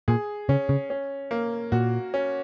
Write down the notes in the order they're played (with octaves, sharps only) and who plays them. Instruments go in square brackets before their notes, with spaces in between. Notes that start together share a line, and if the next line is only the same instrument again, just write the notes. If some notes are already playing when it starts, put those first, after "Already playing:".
[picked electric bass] A#2 [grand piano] G#4
[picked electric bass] C#3 [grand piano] C#4
[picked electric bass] C#3
[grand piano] C#4
A#3
[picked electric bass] A#2 [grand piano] F#4
[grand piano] C#4